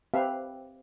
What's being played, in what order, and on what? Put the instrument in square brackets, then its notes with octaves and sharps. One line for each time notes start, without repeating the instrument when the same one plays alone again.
[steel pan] C4 G4 B4 E5 F5